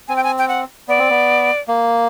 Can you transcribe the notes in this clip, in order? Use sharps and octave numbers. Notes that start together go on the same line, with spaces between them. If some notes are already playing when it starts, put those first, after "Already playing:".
C4 G#5
G5
G#5
G5
F#5
B3 D5
C4
B3
A#3